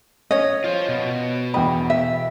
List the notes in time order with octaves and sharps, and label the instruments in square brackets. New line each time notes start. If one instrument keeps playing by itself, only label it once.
[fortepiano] C#4 [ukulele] C#5 D#5
[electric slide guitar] F4 C5
B2
[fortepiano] E2 G5 B5 [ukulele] D#5
[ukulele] E5